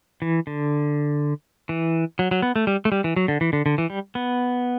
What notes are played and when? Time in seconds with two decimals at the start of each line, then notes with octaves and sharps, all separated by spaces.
0.22 E3
0.47 D3
1.69 E3
2.19 F#3
2.31 F#3
2.42 B3
2.56 A3
2.67 G3
2.85 A3
2.92 G3
3.04 E3
3.16 F#3
3.28 D3
3.41 E3
3.53 D3
3.66 D3
3.78 E3
3.90 G3
4.15 B3